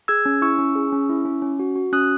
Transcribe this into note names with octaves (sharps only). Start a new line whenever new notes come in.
G#4 E6 G#6
C#4
E4 C#6 E6
C#4
G#4
C#4
E4
C#4
C#4
F#4
F#4
C#4 D#6 F#6